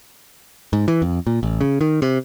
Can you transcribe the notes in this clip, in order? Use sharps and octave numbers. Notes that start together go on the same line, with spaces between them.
G#2
E3
F2
A#2
A1
C#3
D#3
C3